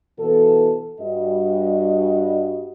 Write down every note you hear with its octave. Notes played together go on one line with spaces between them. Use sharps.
B2 E3 B3 A4
G2 G3 D4 F#4 D#5